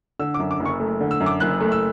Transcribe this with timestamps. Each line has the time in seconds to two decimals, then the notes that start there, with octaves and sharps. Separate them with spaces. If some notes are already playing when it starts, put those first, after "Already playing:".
0.19 D3 E6
0.34 D6
0.40 F#2
0.51 D6
0.60 F#1
0.65 C#6
0.80 A3
1.00 D3
1.11 E6
1.20 F#2
1.26 D6
1.40 F#1 F#6
1.60 A3
1.72 E6